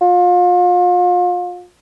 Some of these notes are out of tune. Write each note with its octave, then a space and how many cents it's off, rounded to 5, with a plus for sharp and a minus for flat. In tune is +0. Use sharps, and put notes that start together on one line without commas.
F4 +35